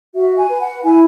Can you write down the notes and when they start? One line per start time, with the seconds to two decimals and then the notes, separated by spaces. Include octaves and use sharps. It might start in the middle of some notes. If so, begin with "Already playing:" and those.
0.14 F#4 E5
0.37 G#5
0.49 B4
0.61 F#5
0.84 E4 G#5